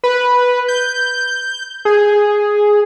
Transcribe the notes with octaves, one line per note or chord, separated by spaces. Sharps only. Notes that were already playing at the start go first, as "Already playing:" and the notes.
B4
G6
G#4